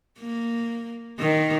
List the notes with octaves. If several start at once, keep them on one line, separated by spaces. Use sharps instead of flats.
A#3
D#3